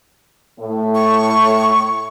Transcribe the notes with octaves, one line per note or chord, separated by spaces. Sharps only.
A2
C#6